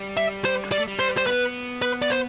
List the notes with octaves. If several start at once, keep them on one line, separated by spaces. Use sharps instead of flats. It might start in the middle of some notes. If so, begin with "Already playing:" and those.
Already playing: G3
E5
C5
G3 D5
A3
G3
C5
C5
B3 B4
B4
D5
C5